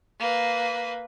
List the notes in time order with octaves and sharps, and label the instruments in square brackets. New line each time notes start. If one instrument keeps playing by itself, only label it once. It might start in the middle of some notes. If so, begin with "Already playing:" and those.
[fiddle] A#3 B4